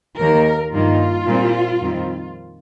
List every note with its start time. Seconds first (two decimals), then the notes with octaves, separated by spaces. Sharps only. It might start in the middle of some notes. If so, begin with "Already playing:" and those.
0.18 D#2 D#3 A#3 A#4
0.72 G2 D#3 A#3 F4
1.27 A#2 G3 C4
1.80 F2 D#3 G3 C4